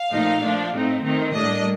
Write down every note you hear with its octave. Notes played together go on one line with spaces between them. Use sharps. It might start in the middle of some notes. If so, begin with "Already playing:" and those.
Already playing: F5
A#2 F3 A3 D#4
F3 A3 D4
A2 A3 C4 D#4
D#3 A3 C4 D#4
A2 G3 A#3 D4 D#5